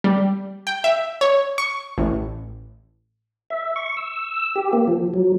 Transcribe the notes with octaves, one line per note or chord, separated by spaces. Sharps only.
G3
G5
E5
C#5
C#6
A1
E5
C#6
E6
G4
A#3
F3
F#3